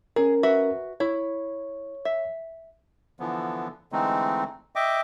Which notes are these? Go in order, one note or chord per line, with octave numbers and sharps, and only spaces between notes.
C#4 G#4 A#4
F#4 B4 E5
E4 C#5
E5
D3 E3 F3 B3
D3 E3 G#3 A3 C4 D#4
D#5 E5 G5 D6